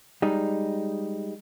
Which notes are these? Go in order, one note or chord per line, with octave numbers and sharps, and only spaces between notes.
G3 G#3 D#4